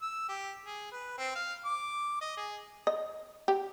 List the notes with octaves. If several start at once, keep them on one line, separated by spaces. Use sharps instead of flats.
E6
G4
G#4
B4
C4
F5
D6
D#5
G#4
D#5
G4